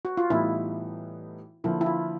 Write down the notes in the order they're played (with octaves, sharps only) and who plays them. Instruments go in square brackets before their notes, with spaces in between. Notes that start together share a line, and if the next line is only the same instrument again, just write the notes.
[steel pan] F#4
F4
[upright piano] A2 E3 G3 B3 D#4 [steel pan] E4
[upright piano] D3 F3 A#3 [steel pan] E4
[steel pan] E4
F4